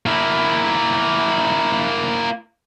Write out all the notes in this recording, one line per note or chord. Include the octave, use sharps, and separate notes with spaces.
A#3 E4